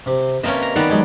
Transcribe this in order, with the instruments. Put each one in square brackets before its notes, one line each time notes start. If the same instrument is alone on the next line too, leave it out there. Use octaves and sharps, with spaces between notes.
[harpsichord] C3
[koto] C3 A#3 C#4 [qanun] B4 D#5 A5 [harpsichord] B5 C6
[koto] A#5
[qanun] D#3 [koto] G3 B3 D5
[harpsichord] F#3 G#3 G#5